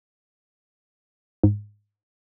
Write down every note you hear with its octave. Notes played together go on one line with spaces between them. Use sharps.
G#2